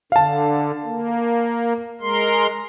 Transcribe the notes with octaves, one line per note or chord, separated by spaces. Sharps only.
D3 F5 A5
A#3
G#3 A#4 C6